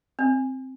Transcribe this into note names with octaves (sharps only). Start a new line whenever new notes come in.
C4